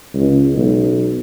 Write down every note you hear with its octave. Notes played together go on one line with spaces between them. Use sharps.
C#2
B1